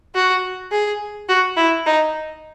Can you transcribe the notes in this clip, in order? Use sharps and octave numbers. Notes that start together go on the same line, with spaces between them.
F#4
G#4
F#4
E4
D#4